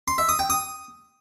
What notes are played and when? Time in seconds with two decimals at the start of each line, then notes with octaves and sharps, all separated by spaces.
0.08 C6
0.18 E5
0.29 D#6
0.39 G5
0.50 D#6